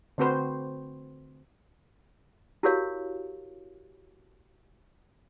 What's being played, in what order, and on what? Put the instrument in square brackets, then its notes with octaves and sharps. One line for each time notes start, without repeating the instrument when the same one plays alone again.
[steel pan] D3 A3 C4 F#4 B4 C5
[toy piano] E4 F#4 G4 A#4 C#5 F5